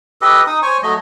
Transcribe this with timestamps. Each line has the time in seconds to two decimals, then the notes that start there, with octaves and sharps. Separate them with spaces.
0.21 G4 A4 B4 D#5
0.47 D#4 D#6
0.62 C5 C#5 G#5 C#6
0.83 F#3 A3 D#5